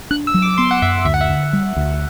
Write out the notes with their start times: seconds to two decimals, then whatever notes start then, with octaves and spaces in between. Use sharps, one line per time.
0.11 D4 F#6
0.27 E6
0.34 F#3
0.42 D6
0.58 B3 C6
0.71 F#5
0.82 F#2 E5
1.05 D2 E5
1.14 F#5
1.21 E5
1.29 D3
1.53 G3
1.77 D2